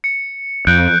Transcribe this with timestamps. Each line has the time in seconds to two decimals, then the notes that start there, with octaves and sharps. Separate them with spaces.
0.04 C#7
0.67 F2 F#6 G6 D7